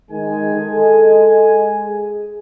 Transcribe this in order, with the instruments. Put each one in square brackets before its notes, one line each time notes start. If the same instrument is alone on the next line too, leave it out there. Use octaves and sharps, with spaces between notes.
[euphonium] D#3 [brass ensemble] G#3 G#5
[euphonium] A4
G#4